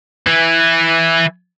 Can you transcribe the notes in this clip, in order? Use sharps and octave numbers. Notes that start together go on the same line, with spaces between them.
E3